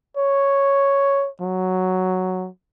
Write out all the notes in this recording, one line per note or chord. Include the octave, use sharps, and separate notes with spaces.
C#5
F#3